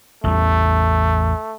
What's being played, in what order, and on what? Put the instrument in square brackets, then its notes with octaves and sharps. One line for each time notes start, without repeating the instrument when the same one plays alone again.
[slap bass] A1 E2 G3 [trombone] A3